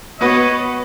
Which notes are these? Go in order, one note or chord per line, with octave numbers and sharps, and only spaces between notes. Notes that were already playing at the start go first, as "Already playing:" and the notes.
B3 F#4 B4 C#5 D#5